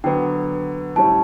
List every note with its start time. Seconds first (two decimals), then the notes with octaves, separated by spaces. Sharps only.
0.04 D3 F#3 B3 G5
0.95 A2 G3 C#4 A5